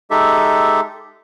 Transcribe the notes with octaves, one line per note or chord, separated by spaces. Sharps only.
G#3 D#4 G4 A4 E5